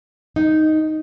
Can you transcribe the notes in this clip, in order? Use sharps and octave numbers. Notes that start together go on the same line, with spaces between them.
D#4